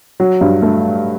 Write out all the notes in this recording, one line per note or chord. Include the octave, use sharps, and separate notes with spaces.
F#3
G2
A3